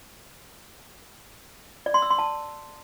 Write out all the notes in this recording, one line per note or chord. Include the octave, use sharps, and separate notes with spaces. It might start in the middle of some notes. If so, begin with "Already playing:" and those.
D5
C6
E6
C6
A5